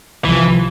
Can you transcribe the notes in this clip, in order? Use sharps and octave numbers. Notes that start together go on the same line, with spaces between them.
C2 C3 E3 F3